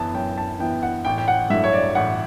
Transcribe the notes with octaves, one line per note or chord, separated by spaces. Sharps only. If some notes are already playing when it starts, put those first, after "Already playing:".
Already playing: F#2 E3 B3 E4 A5
F#2 G5
A5
E3 B3 E4 G5
F#5
A1 G5
G5
F#5
G2 F#3 A3 E4 E5
C#5
D5
A1 F#5